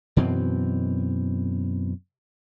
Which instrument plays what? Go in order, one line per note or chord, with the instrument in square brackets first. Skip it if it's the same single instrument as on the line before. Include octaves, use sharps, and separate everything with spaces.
[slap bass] F#2 B2 E3 C4